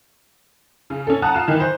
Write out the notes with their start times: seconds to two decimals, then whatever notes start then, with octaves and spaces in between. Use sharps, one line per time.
0.90 C#3
1.07 C#4 A4
1.22 F#5 A5 A#5 D#6 F#6
1.34 F4 E7
1.48 D#3 E3
1.60 C5